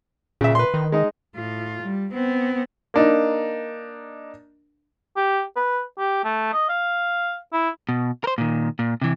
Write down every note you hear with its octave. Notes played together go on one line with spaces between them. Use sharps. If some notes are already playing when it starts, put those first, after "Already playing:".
A#2 C#3 E5
B4 C6
D#3
G#3 D#4
A2 F4
G3
B3 C4
A#3 D4 D#4
G4
B4
G4
A3
D#5
F5
E4
B2
A#4 C5
A#2 D#3
A#2
C3 E3